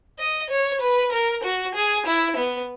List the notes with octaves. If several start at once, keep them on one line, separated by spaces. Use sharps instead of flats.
D#5
C#5
B4
A#4
F#4
G#4
E4
B3